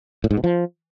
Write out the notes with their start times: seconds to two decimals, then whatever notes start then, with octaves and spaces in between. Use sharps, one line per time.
0.24 A2
0.31 G#2
0.37 B2
0.44 F3